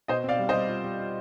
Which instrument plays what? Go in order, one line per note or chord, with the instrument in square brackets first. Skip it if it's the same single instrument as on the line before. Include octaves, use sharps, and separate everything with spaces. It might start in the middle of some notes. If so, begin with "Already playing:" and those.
[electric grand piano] B2 [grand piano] C5 D#5
[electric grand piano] C4 [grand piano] D5 F5
[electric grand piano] G3
[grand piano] C5 D#5
[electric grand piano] G3
F4
G3
F4